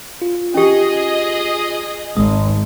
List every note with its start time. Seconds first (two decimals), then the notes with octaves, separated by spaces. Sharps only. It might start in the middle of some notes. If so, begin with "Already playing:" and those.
0.22 F4
0.54 C#4 G4 G#4 D#5
2.17 G#1 G#3 D#6